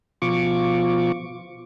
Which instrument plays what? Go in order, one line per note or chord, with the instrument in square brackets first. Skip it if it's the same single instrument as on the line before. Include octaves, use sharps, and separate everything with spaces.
[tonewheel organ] B2 F3 F4 C#6 D6